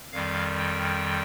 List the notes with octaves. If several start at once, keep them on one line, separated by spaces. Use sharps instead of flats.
F2 D#3 G3 F5
G5